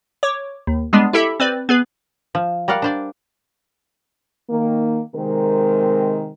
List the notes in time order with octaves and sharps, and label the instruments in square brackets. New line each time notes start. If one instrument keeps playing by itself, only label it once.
[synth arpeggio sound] C#5 D6
D#2
G3 G#3 B3 D4
E4 G4 A4 E5 B5
C4 B4 D5
B3 G#4 B4
[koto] F3
G3 A#4 D5 F5 F#5
D4 C5 D5
[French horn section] D#3 A#3
C3 D#3 G#3 C4 A#4